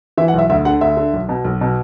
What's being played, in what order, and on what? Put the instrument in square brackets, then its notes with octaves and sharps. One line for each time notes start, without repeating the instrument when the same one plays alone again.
[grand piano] E3 E5
F#5
B1 E5
D2 E5
D3 F#5
D2 E5
D3
B1
B2
B1
B2